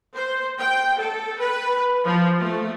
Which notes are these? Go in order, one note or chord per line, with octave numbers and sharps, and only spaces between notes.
C5
G5
A4
B4
F3
A3